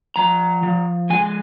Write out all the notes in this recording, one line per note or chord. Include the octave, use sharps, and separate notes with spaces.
F3 A#5
F3
G#3 G#5